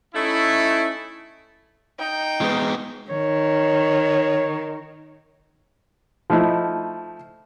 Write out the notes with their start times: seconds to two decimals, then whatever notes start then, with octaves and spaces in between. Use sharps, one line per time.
0.14 A3 C#4 D#4 E4
1.99 D#4 G5
2.41 G#3 B3
3.10 D#3 C#5
6.30 F3 A3 D#4 E4